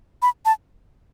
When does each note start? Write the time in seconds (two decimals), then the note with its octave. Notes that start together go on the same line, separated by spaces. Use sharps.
0.22 B5
0.46 A5